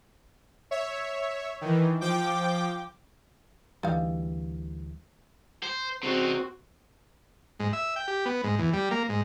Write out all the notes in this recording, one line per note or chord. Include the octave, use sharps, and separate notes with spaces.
C#5 E5
D#3 E3
F3 G5 D6
D2 E3 G3 D#4 F5
C5
C#3 C4 D#4 F#4
G#2
E5
G5
G4
B3
G#2
E2
G3
A#3
G#2